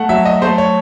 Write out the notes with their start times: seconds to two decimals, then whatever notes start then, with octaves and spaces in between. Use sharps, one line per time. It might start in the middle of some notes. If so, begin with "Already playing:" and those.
Already playing: A3 F#5
0.09 F#3 E5
0.25 D#5
0.42 A3 C5
0.58 C#5